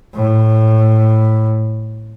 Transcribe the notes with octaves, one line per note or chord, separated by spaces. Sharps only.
A2